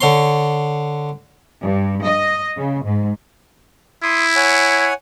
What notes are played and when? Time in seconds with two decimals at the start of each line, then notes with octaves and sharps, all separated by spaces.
0.01 D3 C#5 C6
1.61 G2
2.05 D#5
2.56 C#3
2.85 G#2
4.03 E4 C6 D#6
4.36 C#5 F#5 G#5